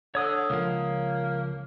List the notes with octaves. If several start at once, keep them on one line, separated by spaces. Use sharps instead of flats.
D3 C#5 D#6
C#2 F3 A#3